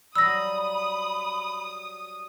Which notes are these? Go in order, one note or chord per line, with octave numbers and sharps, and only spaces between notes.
F#3 G3 B5 D#6 E6 A#6